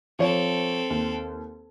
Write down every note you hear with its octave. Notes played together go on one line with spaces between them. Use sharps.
F3 C4 A4 C#5
D#2